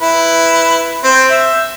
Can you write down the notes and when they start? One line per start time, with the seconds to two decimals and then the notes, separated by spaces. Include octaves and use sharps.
0.01 E4 B4
1.04 C4 C5
1.30 E5